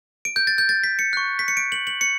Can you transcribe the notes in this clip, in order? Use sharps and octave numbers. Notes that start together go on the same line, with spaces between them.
D7
G6
A6
G6
A6
B6
C#7
C#6 F#6
B6
C#7
D7
F#7
F#7
C#7